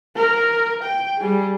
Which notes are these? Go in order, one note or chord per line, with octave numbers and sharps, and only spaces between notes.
A#4
G5
G3 G#4